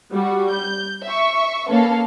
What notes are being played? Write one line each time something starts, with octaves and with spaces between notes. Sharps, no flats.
G3 F#4
G6
E5 C#6
A#3 C#4 A4 B4 C#5 F5